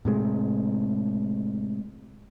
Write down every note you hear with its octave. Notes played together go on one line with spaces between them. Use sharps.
A2 C3 G#3